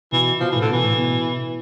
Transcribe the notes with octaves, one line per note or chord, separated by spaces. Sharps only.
B2 E3
B2 F3
A2 E3
A2 D3
B2 E3
A2
B2